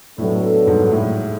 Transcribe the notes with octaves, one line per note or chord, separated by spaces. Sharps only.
A2 F#3 B3 D4 A4
G#2
A2